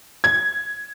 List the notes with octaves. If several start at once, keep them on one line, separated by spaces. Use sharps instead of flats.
G#6